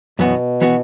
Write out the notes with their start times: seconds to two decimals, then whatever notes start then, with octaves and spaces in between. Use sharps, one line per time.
0.19 F#2 B2 E3 B3 F#4
0.61 E3 B3 F#4